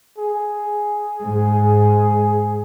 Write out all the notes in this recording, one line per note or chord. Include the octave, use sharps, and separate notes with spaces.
G#4
G#2